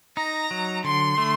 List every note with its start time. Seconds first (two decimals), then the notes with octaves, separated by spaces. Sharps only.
0.17 D#4 A#5
0.51 F#3
0.84 D3 C6
1.18 A3